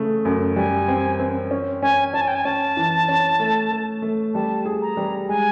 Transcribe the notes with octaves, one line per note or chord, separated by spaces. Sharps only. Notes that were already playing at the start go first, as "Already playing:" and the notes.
Already playing: C#3 A3
F#2
G3 G#5
C4
C4
C#4
C#4 G#5
C#4 A5
G#5
G5
G#5
C#4 A5
E3
C#4
A3
A3
A3
G3 A5
G#4
A#5
G3
G#3 G#5